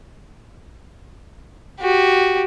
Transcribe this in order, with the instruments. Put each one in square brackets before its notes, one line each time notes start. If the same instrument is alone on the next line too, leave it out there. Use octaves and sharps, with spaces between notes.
[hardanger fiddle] F#4 G4